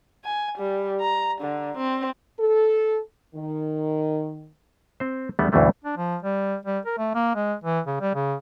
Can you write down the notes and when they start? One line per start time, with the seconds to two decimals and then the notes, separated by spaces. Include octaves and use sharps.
0.24 G#5
0.58 G3
1.01 A#5
1.41 D3
1.77 C4
2.40 A4
3.36 D#3
5.00 C4 C5
5.39 E2 G3 A3 B3 D4
5.52 D2 G2 B2 E3 A3 C#4
5.84 D4
5.97 F3
6.22 G3
6.66 G3
6.86 A#4
6.98 A3
7.15 A#3
7.35 G#3
7.64 E3
7.87 C#3
8.01 G3
8.15 C#3